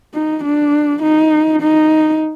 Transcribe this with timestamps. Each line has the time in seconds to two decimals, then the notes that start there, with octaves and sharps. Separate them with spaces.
0.14 D#4
0.44 D4
1.02 D#4
1.62 D#4